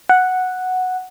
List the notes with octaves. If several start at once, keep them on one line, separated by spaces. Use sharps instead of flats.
F#5